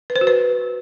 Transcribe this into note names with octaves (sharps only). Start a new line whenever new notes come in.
B4
C5
F#4
B4